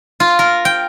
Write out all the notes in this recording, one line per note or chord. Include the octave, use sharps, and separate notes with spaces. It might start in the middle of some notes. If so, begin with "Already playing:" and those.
F4
A#4
G5